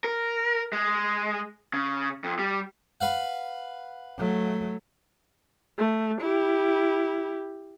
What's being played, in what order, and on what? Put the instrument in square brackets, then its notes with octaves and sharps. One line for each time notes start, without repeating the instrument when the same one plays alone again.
[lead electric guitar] A#4
G#3
C#3
F2
G3
[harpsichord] B4 F5 F#5
[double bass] F#3 A3
[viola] A3
E4 G4